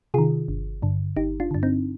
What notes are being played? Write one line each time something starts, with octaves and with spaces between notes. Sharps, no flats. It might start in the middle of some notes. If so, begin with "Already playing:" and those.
C3 D#3 F4 G#4
G1
G2 D3
G1 D#4 G4
D4 F4
G2 D3 D4
C4 D#4